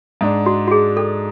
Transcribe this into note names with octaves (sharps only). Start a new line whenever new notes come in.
G#2 G#3 D4
F#4
F#4
G#4
A4